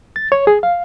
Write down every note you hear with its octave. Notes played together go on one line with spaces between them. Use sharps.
A6
C#5
G#4
F5